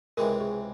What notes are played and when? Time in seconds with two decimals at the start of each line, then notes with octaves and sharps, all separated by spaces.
0.17 C#2 C3 E3 G#3 A#4
0.41 G#4